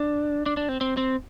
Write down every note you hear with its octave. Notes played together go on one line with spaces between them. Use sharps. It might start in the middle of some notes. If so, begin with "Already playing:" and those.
Already playing: D4
D4
D4
C4
C4
C4